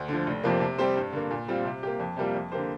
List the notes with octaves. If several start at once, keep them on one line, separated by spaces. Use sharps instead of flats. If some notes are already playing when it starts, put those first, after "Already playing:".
Already playing: D2
D3 F3
F1
F2 C3 F3 A#3
C3
G3 C4 G4 C5
G2
D3 A#3
A#2
G3 C4 F4
C3
A#3 G4
F2
C3 G3 A#3 F4
F2
D3 A#3 G4 C5